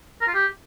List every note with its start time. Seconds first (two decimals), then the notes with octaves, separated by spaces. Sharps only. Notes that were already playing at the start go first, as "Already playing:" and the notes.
0.21 A#4
0.28 F4
0.34 G4